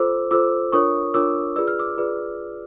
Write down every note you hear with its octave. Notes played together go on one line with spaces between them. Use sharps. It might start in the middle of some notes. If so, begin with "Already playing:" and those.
Already playing: F4 A4 C5 D6 E6
F4 A4 C5 D6 E6
D4 F4 A#4 C#5 C#6 D#6
D4 F4 A#4 C#5 D6 E6
F4 G#4 B4 D5 E6
F6
D6 E6
F4 G#4 B4 D5